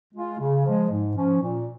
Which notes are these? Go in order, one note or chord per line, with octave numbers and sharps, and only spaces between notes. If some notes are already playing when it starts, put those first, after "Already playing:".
G#3 F4
C#3
F3 G#3
G#2
F3 C#4
A#2